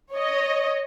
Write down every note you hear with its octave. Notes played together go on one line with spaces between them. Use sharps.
C#5 D#5